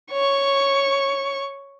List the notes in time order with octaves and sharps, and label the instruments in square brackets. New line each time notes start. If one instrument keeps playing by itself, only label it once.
[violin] C#5 C#6